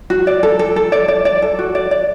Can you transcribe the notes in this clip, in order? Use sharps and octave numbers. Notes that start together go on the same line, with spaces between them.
F#4
D5
A4
A4
A4
D5
D5
D5
A4
F#4
D5
D5